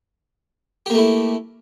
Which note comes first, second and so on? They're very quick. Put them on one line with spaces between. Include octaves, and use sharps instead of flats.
G4 A#3 A3 E4